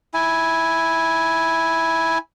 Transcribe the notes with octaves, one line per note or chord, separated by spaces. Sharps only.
E4 G#5